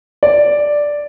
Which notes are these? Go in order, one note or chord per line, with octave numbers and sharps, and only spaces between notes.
D5